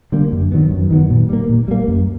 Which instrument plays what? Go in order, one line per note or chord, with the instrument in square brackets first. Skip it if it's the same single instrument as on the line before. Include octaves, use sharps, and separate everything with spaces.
[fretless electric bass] D3 G3 A#3
F#2
D#3 F#3 B3
F#2
D#3 F#3 B3
A#2
G3 A#3
A#2
G3 A#3
F#2